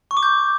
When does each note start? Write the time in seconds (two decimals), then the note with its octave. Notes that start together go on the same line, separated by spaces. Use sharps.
0.11 C#6
0.17 D6
0.23 G6